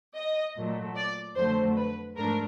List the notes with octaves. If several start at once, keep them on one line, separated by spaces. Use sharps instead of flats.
D#5
A#2 F#3 A3
D5
F2 D3 F#3 A3 C5
B4
G#2 F3 A3 D4 A#4